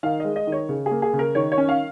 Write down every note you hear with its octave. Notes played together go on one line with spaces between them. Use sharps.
D#3 F5
G#3 D#5
D#5
D#3
C#5
C#3
G#4
A#3
G#4
C#3
A#4
D#3 C#5
C#5
C#4
F5